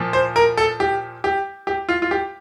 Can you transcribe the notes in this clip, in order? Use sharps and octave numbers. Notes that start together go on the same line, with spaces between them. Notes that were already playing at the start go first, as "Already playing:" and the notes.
Already playing: A#2 F3
C5
A#4
A4
G4
G4
G4
F4
F4
G4